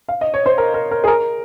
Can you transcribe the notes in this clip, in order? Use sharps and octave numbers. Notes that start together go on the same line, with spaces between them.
F5
D#5
C#5
C5
A#4
A#4
A#4
G#4
A#4